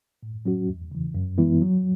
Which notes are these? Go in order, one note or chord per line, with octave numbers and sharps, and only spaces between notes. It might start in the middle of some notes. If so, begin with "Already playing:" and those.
A2
F#3 C#4 F#4
E2
C#3 E3
F#2
E3 G#3 B3 E4
F#3